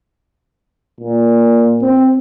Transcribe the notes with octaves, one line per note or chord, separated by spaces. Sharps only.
A#2
C4